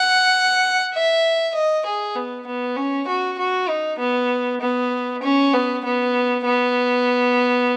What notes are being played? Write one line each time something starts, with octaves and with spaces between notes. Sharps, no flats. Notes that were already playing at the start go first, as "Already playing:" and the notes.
Already playing: F#5
E5
D#5
G#4
B3
B3
C#4
F#4
F#4
D#4
B3
B3
C#4
B3
B3
B3